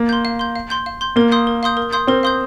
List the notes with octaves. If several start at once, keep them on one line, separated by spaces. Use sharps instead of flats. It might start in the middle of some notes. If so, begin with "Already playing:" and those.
Already playing: A#3
C6 G6
F5
C6 G6
F5
C6 G6
F5
C6 G6
A#3 A#4
F5 C6 D#6 G6
A#4
F5 C6 D#6 G6
A#4
F5 C6 D#6 G6
C4 A#4
F5 C6 D#6 G6